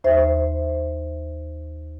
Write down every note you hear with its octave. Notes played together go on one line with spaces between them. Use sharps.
D#2 C5 E5